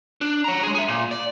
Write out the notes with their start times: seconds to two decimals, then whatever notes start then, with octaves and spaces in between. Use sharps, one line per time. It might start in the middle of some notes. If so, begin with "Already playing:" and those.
0.21 D4
0.44 C#5 A#5
0.63 G#3 G#4
0.75 G#4 E5
0.88 A#2
1.11 D5